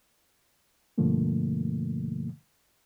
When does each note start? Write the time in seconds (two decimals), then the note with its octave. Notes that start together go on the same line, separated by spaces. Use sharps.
0.98 G2 B2 D3 F3 A3 A#3